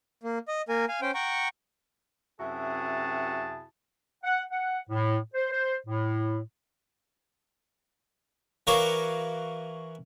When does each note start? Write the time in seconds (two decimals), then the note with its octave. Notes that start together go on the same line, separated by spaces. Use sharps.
0.23 A#3
0.48 D#5
0.69 A#3 A#4 G#5
0.89 F5 G#5
1.02 C#4 C5 G5
1.14 F#5 G5 A#5 C#6
2.39 F#2 C3 E4 F#4 G#4 A5
4.24 F#5
4.50 F#5
4.89 A2
5.34 C5
5.51 C5
5.87 A2
8.67 E3 F#4 A#4 C#5 F5 D6